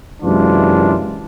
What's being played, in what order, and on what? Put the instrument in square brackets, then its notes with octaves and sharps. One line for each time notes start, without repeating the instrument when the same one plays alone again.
[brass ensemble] F#2 C3 E3 G#3 D4 F4